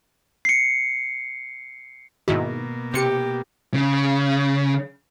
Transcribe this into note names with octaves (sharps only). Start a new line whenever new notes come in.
C7 C#7
G#2 B2 D#3 A#3 E4 F#4
C3 G4 C#7
C#3